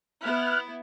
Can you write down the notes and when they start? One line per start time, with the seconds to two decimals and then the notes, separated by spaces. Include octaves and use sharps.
0.21 B3 E4 F6 F#6